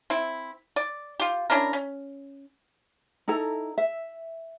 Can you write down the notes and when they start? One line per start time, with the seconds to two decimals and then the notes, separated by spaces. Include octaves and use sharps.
0.10 C4 E4
0.76 D5
1.20 F4 G4
1.50 C#4 D4 E4 A#4
1.73 C#4
3.28 D#4 E4 A4 A#5
3.78 E5